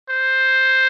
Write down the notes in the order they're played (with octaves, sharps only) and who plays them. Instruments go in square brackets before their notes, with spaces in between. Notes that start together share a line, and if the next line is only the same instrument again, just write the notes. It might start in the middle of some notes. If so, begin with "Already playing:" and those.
[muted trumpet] C5